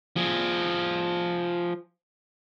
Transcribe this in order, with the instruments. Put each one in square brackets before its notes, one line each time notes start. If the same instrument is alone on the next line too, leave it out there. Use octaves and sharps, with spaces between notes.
[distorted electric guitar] F3 G#4